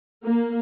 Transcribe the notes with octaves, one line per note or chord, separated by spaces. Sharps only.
A#3